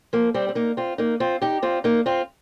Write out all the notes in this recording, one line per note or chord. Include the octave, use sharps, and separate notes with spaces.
F3 A#3
G3 C4
C4
A#3 D#4
C4 F4
A#3 D#4
C4 F4
D#4 G4
C4 F4
A#3 D#4
C4 F4